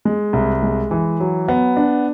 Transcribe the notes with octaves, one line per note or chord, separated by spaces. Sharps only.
G#3
C2
G#3
E3
F#3
B3
D4